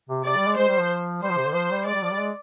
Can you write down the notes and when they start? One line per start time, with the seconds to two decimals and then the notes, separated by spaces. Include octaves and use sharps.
0.09 C3
0.25 C3 D5
0.36 G3
0.47 G#3
0.57 G#3 C5
0.68 G3
0.79 F3
1.22 G3 C5
1.30 F3
1.38 C3
1.46 D3
1.54 F3 C5
1.71 G3
1.86 G#3 D5
1.94 G3
2.03 F3
2.12 G3
2.19 G#3